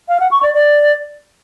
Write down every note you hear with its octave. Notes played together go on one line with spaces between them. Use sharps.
F5
F#5
C#6
D5
D5